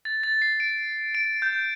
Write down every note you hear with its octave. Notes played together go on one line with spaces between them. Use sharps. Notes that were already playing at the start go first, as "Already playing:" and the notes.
A6
A6
C7
D7
D7
G6